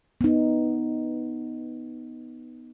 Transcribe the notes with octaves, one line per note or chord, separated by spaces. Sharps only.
B3 D#4